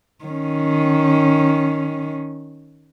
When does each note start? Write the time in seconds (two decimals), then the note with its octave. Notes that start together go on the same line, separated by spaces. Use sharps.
0.24 D#3 C#4